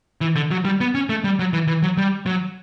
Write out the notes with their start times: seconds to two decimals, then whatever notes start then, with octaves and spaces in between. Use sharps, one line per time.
0.21 E3
0.35 D3
0.51 F#3
0.65 G3
0.80 B3
0.95 C#4
1.09 A3
1.24 G3
1.39 F#3
1.53 E3
1.68 E3
1.82 F#3
1.97 G3
2.26 F#3